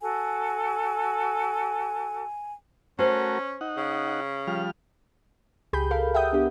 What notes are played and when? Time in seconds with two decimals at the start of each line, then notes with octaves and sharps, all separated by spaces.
0.01 F#4 A4 G#5
2.99 A3 C#4 F#4 A#4 C5
3.61 D#4 F#5
3.77 C#3
4.47 F3 G3 F6
5.73 C#2 G4 G#4 B5 G6
5.90 A4 A#4 F5 B5
6.14 E5 F#5 G5 D#6 G6
6.33 B3 D4 G4